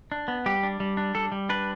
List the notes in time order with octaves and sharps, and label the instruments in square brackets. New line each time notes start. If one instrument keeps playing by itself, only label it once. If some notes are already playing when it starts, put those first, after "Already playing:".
[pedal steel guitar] D4
B3
G3 G4
D4
G3
D4
G3 A4
G3
D4 B4